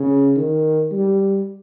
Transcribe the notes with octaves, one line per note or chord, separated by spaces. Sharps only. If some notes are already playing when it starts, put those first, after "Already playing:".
Already playing: C#3
D#3
G3